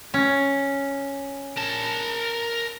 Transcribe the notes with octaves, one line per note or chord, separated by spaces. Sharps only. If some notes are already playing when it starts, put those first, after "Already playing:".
C#4
A#4 A5